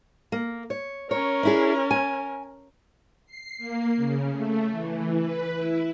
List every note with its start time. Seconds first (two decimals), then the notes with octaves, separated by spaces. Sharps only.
0.32 A#3
0.70 C#5
1.11 C#4 A#4 C#5
1.43 D4 E4 G#4
1.91 G#5
3.26 C7
3.58 A#3
3.97 C#3
4.31 A3
4.71 E3
5.19 B4
5.52 E4